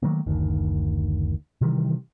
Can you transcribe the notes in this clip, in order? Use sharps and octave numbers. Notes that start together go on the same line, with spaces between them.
D#3 F#3 A3 A#3
F#1 D2 D#3
C3 D#3 E3 G3